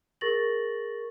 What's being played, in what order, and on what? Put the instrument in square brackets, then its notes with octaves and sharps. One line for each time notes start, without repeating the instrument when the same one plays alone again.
[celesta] G#4 A#4 C#6 A6 A#6 F#7